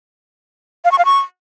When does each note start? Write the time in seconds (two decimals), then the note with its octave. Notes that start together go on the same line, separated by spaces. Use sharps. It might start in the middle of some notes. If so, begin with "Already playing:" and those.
0.85 F5
0.92 C#6
0.98 F5
1.05 C#6